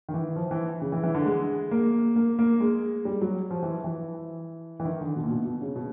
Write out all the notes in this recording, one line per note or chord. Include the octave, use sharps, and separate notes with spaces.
D#3
E3
F3
E3
C#3
E3
E3
D3
G#3
A#3
A#3
A#3
G#3
G3
F#3
F3
E3
E3
E3
D#3
D3
B2
A#2
B2
B2
C#3
B2